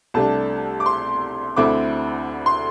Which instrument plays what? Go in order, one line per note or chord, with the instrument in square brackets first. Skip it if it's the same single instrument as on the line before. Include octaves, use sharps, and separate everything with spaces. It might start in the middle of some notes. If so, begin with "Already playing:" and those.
[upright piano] C2 C3 A3 D4 A5
D6
C6
D2 D3 C4 E4 D6
C6